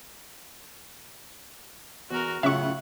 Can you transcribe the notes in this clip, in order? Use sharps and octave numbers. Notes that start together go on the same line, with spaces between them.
E2 F#4 A#4
F#2 A2 C#3 F4 E5 F#5 C#6